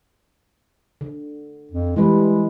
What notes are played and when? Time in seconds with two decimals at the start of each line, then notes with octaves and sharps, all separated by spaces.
1.01 D3
1.71 F2
1.96 E3 G3 G#3 B4